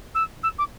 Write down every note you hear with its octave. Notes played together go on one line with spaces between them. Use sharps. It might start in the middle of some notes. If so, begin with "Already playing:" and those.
E6
E6
D6